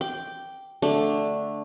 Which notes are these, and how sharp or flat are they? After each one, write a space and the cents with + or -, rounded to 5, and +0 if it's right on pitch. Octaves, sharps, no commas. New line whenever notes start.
G5 -5 D6 +0
D3 +0 A3 +0 D4 -5